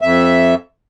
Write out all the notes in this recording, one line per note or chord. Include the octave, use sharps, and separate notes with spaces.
F2 E5